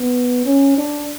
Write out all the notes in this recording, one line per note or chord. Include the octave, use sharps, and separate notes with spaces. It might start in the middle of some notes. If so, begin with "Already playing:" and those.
Already playing: B3
C#4
D4